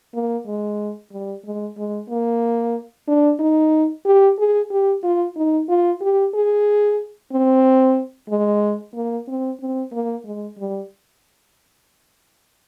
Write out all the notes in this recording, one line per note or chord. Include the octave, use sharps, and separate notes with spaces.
A#3
G#3
G3
G#3
G#3
A#3
D4
D#4
G4
G#4
G4
F4
D#4
F4
G4
G#4
C4
G#3
A#3
C4
C4
A#3
G#3
G3